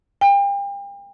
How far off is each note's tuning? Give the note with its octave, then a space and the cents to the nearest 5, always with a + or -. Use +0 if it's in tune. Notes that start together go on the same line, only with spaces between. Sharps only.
G5 +35